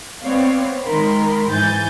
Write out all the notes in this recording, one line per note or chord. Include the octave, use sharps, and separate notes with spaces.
B3 C4 C#5 D5 F5
D#3 G#3 A#4 B5 C6
G#2 E3 G#5 G6 A6